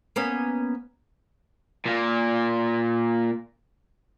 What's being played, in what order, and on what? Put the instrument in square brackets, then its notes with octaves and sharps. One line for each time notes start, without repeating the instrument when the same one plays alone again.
[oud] A#3 B3 C#4
[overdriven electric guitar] A#2 A#3